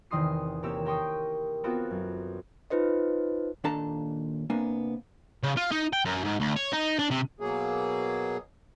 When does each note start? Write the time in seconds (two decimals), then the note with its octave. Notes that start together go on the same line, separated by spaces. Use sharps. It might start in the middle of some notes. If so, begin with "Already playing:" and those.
0.11 E2 C3 D#3 C6 D#6 C7
0.63 C3 A#3 C4 G4 C#5 E6
0.85 G4 A#4 G5 C6 C#6 D#6
1.64 B3 C4 F4 F#4 A4
1.91 F#2
2.70 D#4 F4 B4 C5 D#5
3.64 D#2 A#2 D4 A4 A5 A#5
4.50 C3 A#3 B3 D4 G#5
5.43 C#3
5.57 F4
5.71 D#4
5.93 G5
6.05 F#2
6.25 G#2
6.40 D2
6.56 C#5
6.73 D#4
6.99 D4
7.11 C3
7.40 B2 F#3 A#3 G#4